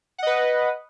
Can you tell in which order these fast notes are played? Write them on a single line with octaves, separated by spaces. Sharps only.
F#5 D#5 B4